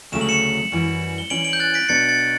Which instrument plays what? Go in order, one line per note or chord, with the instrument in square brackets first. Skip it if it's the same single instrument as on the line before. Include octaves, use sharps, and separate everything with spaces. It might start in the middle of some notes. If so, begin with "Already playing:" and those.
[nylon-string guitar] D2 C#3 F#3 A3 [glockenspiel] E7
[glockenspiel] F#7
C#7 E7
[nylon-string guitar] F#2 E3 G3
[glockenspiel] G7
[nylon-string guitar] E3 G3 C#4 [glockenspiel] D7 F#7
[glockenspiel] D7 F#7
G6
F#6 A6
B6 D7
[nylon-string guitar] B2 F#3 B3 D4 [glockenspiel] A6 C#7
[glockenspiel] A6 C#7